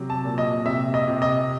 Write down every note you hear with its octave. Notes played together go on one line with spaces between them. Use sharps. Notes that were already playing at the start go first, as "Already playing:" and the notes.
Already playing: C3 F#3
A5
A#2
D#5
C3 E5
D#5
C3
D#5